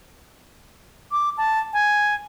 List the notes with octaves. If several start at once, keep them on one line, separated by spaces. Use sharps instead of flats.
D6
A5
G#5